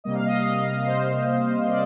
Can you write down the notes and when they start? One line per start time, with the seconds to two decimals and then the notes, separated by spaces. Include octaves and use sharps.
0.04 C3 G3 A#3 D#5
0.14 F5
0.25 D#5
0.35 F5
0.46 D#5
0.56 F5
0.66 D#5
0.77 F5
0.87 C5 D#5
1.69 D5 F5